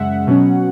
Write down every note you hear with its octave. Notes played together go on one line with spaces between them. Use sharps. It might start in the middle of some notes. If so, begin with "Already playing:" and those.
Already playing: F#2 C#3 G#3 E5 F#5
B2 F#3 C#4